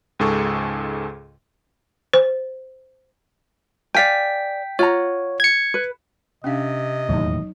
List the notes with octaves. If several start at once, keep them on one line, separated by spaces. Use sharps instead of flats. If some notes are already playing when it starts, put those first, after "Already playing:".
C#2 G#2 G#4 A4 C#6
C5
D5 F5 G5 G#5 B6
F4 C#5 F#5 A#5
G#6 C#7
B4
C3 C#4 D4 D#5 F5
E1 D#2 A2 F#3 D#4